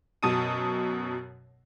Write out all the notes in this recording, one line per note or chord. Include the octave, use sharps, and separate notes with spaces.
F#2 B2 A5 D#6 D#7